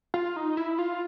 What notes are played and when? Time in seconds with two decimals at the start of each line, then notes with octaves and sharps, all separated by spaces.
0.14 F4
0.36 D#4
0.57 E4
0.78 F4